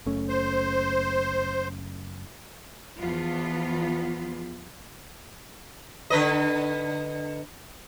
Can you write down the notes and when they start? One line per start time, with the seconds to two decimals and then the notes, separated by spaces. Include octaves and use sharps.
0.06 F#1 A3 C#4
0.29 C5
2.98 E2 E3 F3 B3 F4
6.10 D3 B4 D#5